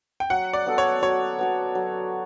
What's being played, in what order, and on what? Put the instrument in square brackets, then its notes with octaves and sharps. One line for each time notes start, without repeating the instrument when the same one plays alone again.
[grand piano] G5
[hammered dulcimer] F#3 [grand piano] F#5
[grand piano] D5
[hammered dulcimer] B3 F#4 A4
[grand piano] C#5
[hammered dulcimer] F#3 [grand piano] C#5
[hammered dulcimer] B3 F#4 A4
F#3